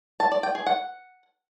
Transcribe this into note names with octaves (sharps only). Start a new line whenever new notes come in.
A5
D5
G5
G#4
F#5